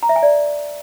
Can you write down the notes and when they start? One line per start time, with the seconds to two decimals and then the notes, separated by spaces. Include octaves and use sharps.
0.03 A#5
0.09 E5
0.16 G#5
0.23 D5